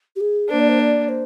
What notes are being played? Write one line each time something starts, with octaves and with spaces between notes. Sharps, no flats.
G4
G#4
A#3 D4 C5
D5
C5
D5
C5